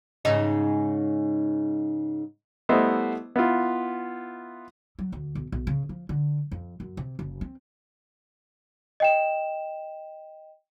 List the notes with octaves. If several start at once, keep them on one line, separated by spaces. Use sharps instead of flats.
G#2 C#3 D#4
G3 A3 B3 E4 C5 D#5
B3 E4 F4
F#3
D2
B1
B1
C#3
F3
D3
F2
F#2
C3
F#1
C4
D#5 G5 E7